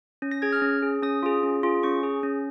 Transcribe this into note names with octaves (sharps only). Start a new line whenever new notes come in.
C#4
A#6
G#4 G#6
F6
C#4
G#4
C#4 D#6
F4 G#4
C#4
F4 G#4
C#4 C#6
G#4
C#4